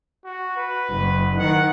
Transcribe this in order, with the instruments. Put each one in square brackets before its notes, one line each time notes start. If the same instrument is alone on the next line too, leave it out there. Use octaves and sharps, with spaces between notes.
[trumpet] F#4
B4
[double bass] F#1
[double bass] D#3 [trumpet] F#5